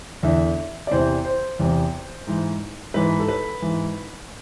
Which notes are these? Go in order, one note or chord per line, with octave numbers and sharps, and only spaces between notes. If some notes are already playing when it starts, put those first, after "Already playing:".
E2 D3 E5
D5
E2 C3 E3 C5
C5
E2 C3 E3
G#2 E3
G#2 E3 B4
A4
B4
G#2 E3